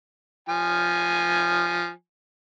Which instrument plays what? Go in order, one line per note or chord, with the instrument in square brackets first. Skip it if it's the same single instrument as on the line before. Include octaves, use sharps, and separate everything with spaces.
[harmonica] F3 G#5